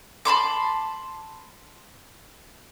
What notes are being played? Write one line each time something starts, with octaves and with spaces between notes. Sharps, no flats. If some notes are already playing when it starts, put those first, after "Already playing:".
A5 B5 C6 D6